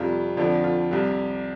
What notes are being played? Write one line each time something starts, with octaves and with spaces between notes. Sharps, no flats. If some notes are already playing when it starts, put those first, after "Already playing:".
Already playing: F2 C3 G3 F4
F2 D3 F3 D4
F4
C2 C3 G3 G4